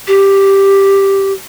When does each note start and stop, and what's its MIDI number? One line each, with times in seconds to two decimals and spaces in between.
0.07 1.32 67